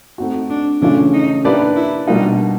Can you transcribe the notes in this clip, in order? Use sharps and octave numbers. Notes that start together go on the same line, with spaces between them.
A3 C4 D#4 F#4
D4
C#3 E3 A3 C#4 D4 F4
D#4
A#3 D4 E4 G4 B4 D5
E4
B2 G3 A#3 D4 D#4 F4